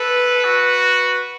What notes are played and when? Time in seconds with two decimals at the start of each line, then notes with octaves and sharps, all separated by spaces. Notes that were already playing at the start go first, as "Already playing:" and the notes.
Already playing: A4 B4
0.44 F#4